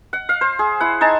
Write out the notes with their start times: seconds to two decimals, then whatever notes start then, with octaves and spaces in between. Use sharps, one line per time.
0.13 F#5
0.29 F5
0.41 C5
0.59 G#4
0.80 E4 F#5
1.01 D#4 G#5 A5